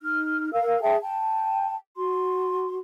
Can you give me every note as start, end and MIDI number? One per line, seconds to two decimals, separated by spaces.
0.01 0.49 63
0.01 0.49 89
0.52 0.79 70
0.52 0.79 77
0.52 0.79 88
0.82 0.97 68
0.82 0.97 76
0.82 0.97 79
0.82 0.97 81
1.02 1.75 79
1.02 1.75 81
1.96 2.78 66
1.96 2.78 84